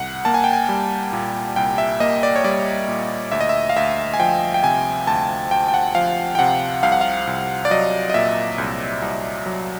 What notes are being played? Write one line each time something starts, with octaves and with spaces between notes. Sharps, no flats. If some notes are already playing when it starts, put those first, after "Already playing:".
Already playing: C2 F#5
A#3 A5
G#5
G5
G#5
G3
A#2
C2 G5
E5
A#3 D#5
D5
C#5
G3 D5
A#2
D2 E5
D#5
E5
F5
D2 E5
G#5
F3 G5
G5
C3 G#5
D2 A5
D2 G5
G5
F#5
F3 F5
G5
C3 F#5
C2 F5
F#5
F5
C2
D5
F#3 D#5
D#5
A#2 E5
C2
C2
F#3